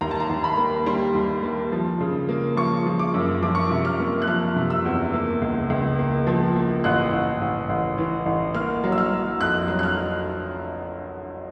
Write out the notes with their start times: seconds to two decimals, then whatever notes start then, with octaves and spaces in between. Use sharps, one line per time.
0.01 D#2 A#5
0.11 A5
0.20 A#5
0.29 D#2
0.44 B5
0.57 A#3
0.86 G3 C6
1.15 D#2
1.43 A#3
1.72 F3
2.00 C#3
2.29 A#3
2.57 F3 C#6
2.86 F3
2.99 D6
3.14 F#2
3.43 F3 D6
3.55 C#6
3.67 D6
3.71 C3
3.85 F6
3.99 A#3
4.22 F#6
4.28 F3 F6
4.56 C3
4.70 E6
4.85 E2
5.13 A#3
5.42 C#2
5.70 C#2
5.99 A#3
6.27 F3
6.56 A#3
6.84 A1 F#6
7.13 A1
7.41 A1
7.69 A1
7.98 E3
8.26 A1
8.54 A#3 F6
8.84 F#3
8.92 E6
8.98 F6
9.12 F#3
9.40 F2 F#6
9.68 F#3
9.79 F#6
9.83 F6